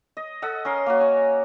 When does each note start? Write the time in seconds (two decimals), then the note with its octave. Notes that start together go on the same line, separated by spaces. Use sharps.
0.17 D#5
0.42 A4 D#5 F#5
0.65 C#4 A#4 C6
0.86 A#3 C#4 F#4
1.00 C#5 G#5